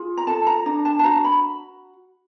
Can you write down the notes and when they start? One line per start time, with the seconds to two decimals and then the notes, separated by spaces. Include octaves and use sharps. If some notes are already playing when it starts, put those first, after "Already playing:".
Already playing: F4 G#4
0.17 A#5
0.27 A4 A5
0.47 A#5
0.66 D4 A#5
0.85 A5
0.99 A5
1.04 F#4 A#5
1.24 B5